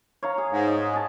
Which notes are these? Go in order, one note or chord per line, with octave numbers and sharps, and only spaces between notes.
C#5 F5 A#5
G#4
G#2
D#5
G#4 A5